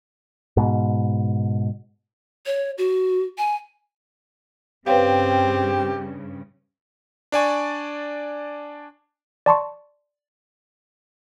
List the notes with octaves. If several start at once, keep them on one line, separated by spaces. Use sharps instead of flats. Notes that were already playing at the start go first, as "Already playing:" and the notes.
G#2 B2
C#5
F#4
G#5
G2 C#3 C4 G4 B4 C#5 F5
D4 D5 G#5 C#6
D5 A5 C6 C#6